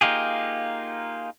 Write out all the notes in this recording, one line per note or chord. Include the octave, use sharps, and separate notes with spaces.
A#3 D#4 F4 G4 G#4